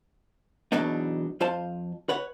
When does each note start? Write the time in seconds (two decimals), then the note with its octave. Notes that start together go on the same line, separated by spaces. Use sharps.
0.72 E2 B2 F#3 B3 D4 D#4
1.40 F2 F4 C5 F5 A5
2.09 B4 C#5 F#5